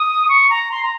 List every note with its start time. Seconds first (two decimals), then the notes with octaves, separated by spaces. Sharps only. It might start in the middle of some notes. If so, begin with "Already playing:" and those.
Already playing: D#6
0.29 C#6
0.50 A#5
0.72 C6
0.83 A#5